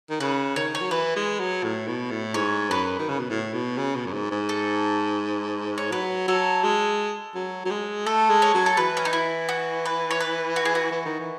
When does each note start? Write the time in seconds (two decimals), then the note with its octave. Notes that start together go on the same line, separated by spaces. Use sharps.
0.10 D#3
0.20 C#3 B4
0.56 D#3 C#5
0.75 C#5
0.81 F#3
0.91 E3 B4
1.16 G#3
1.39 F#3
1.63 A2
1.87 B2
2.11 A2
2.34 G#2 C#5
2.70 F#2 B4
2.99 D#3
3.09 C#3
3.19 B2
3.30 A2
3.54 B2
3.78 C#3
3.95 B2
4.06 F#2
4.13 G#2
4.31 G#2
4.49 A4
5.78 C#5
5.92 F#3 B4
6.28 F#3 A4
6.64 G#3
7.35 F#3
7.65 F#3
7.70 G#3
8.06 A3 A4
8.30 G#3
8.42 C#5
8.54 F#3
8.66 A4
8.77 E3 B4
8.97 C#4
9.05 D#4
9.13 E4
9.49 F#4
9.85 B4
10.11 C#5
10.21 B4
10.56 F#4
10.65 G#4
10.75 F#4
10.92 E3
11.05 D#3
11.20 E3